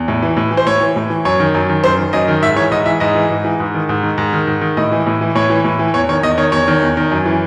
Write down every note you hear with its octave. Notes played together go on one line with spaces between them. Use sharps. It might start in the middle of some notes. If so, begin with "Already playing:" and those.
Already playing: E2
A2
E3
A2
E3
C5
A2 C#5
E3
A2
E3
F#2 C#5
D#3
F#2
D#3
F#2 C5
D#3
F#2 D#5
D#3
G#2 E5
E3 C#5
G#2 D#5
E3 E5
G#2 D#5
E3
G#2
E3
G#2
D#3
G#2
D#3
G#2
D#3
G#2
D#3
A2 D#5
E3
A2
E3
A2 C#5
E3
A2
E3
E2 C#5
D#3 C#5
E2 D#5
D#3 C#5
E2 C#5
D#3
E2
D#3
F#2
E3